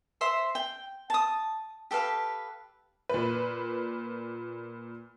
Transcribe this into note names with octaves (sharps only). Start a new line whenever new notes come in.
C5 E5 C6
G5
A5 D#6
G4 A4 B4 F5
A#2 B4